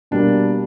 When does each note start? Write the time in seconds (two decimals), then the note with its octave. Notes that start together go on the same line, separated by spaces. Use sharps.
0.11 B2 G3 A#3 D4